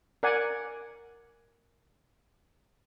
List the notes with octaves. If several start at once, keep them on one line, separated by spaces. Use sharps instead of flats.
A#4 D5 F#5 G#5